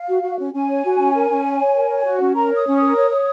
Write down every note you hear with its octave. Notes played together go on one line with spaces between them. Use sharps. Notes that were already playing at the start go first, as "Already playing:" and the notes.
Already playing: F5
F#4
F#4
C#4
C#4 G#5
C#5
F#4
C#4
A#4
C#4
C#5
C#5
A#4
C#5
F#4
C#4
A#4 A#5
C#5 D#6
C#4
D#6
A#4
C#5
C#5